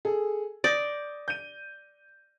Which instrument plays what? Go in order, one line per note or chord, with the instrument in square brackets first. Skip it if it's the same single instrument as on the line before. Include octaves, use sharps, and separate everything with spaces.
[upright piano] G#4 A4
[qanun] D5 [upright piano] D#6 G6 A#6
[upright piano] G6 D#7